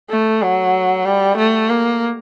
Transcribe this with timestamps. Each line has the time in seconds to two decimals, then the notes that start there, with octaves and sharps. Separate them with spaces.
0.10 A3
0.42 F#3
1.05 G3
1.38 A3
1.70 A#3